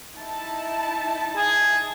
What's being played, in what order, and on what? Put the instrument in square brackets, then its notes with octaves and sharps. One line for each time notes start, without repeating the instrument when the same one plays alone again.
[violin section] D#4 E4 A5
[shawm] G#4